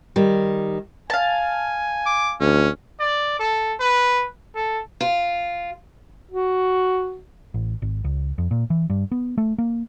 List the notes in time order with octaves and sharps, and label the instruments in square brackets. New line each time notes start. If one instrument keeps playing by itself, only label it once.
[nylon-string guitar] D#3 G3
[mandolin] F5 A5 [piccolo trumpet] G#5
[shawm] D6
[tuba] D2 [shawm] C#4
[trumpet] D5
A4
B4
A4
[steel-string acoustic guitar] F4
[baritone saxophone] F#4
[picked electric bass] A1
G#1
C#2
F2
A#2
E3
G2
B3
A3
A#3